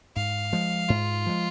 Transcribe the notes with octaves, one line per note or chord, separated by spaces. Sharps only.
G#2 F5
F3 G#3
G#2 F4
F3 G#3